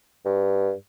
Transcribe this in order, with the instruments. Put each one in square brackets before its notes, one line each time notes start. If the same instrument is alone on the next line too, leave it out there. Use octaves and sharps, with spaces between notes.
[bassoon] G2